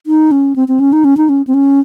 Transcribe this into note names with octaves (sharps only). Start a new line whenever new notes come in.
D#4
C#4
C4
C4
C#4
D#4
C#4
D#4
C#4
C4
C#4